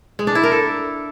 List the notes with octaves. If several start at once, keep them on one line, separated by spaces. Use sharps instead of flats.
G#3
D4
E4
A#4
A4